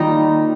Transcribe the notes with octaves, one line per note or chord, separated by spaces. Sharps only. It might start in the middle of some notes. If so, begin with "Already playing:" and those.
Already playing: D#3 G3 A#3 D#4 F4